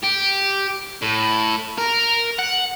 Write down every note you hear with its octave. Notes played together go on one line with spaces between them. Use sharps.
G4
A2
A#4
F#5